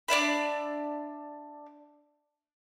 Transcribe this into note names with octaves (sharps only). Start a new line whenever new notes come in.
D4 D5 E5 B5